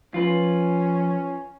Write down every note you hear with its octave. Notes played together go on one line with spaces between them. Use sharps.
F3 C#4 F4 B4